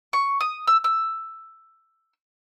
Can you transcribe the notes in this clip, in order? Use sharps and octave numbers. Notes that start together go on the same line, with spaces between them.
C#6
D#6
E6
E6